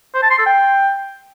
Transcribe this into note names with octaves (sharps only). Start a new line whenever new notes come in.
C5
A5
C6
A4
G5